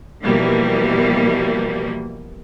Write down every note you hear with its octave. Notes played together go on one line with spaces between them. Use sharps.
B2 E3 F3 G3 A#3